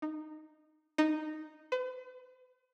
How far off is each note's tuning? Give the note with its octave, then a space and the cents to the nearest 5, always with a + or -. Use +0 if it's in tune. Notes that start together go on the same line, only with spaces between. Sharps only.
D#4 -15
D#4 -10
B4 +45